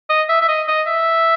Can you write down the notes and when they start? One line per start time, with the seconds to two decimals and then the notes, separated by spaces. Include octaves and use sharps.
0.09 D#5
0.29 E5
0.41 E5
0.48 D#5
0.68 D#5
0.86 E5